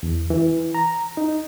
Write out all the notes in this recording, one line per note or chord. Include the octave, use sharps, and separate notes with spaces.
E2
E3
A#5
D#4